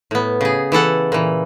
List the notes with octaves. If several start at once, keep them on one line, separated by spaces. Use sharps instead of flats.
A2 B3
C#3 G#4
E3 E4 A4 F#5
A#2 E3